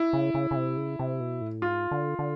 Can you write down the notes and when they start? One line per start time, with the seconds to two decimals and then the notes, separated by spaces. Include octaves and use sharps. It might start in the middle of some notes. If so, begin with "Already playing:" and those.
Already playing: E4
0.13 C#3
0.34 C#3
0.51 C#3
0.56 C3
0.77 C#3
0.99 C3
1.20 B2
1.41 A2
1.62 G#2 F4
1.91 D3
2.19 D3